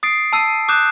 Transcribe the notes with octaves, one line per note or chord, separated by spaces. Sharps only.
D#6 A6 C7 D7
A5 E6 C7 D#7
D6 D#6 F#6 G6 E7